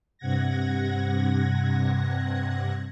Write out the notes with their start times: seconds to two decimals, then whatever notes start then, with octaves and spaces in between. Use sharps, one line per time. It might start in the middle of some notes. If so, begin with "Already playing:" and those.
0.18 G2 C3 F#5 G#6 A#6